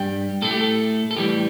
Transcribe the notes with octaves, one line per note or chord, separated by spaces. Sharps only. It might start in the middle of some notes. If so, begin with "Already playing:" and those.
Already playing: G2 G3 G5
A2 A3 A4
G4
A4
A4
A2 E3 G3 G4